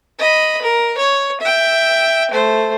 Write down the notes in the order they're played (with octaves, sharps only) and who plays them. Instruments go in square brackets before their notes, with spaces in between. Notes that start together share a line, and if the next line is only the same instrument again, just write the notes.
[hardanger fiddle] D#5 B5
A#4
C#5
E5 G5
A3 C5